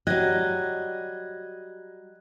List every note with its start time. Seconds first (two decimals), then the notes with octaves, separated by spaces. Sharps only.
0.07 F#3 G3 D#5 F#6 G#6